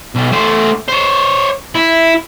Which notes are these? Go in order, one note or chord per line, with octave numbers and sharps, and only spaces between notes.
B1
A3 C5
C5 C#5
E4